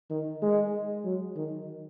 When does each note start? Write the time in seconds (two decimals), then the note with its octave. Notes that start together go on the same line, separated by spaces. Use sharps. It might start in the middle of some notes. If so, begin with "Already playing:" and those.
0.10 D#3
0.42 G#3
1.04 F#3
1.36 D#3